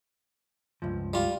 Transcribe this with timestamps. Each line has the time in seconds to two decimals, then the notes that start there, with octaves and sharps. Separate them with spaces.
0.82 C#2 G2 F3
1.14 G3 F4